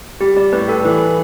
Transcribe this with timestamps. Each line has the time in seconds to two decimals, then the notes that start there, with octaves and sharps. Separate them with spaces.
0.20 G3 G4
0.36 G3 D5
0.52 A2 B4
0.68 G4 A4
0.85 E3 B4